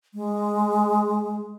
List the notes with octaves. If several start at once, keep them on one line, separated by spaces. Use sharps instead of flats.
G#3